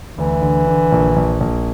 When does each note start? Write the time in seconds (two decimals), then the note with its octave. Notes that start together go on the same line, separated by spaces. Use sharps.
0.17 D2 E3
0.42 D3
0.67 D3
0.92 A#1
1.16 A#1
1.40 A#1